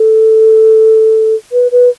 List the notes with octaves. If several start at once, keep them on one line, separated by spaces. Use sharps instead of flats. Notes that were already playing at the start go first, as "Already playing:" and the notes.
Already playing: A4
B4
B4